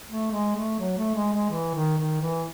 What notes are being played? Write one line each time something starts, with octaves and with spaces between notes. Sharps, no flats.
A3
G#3
A3
F#3
A3
G#3
G#3
E3
D#3
D#3
E3